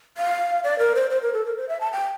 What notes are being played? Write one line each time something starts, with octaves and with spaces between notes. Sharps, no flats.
F5
D5
A#4
C5
C5
A#4
A4
A#4
C5
E5
A5
G5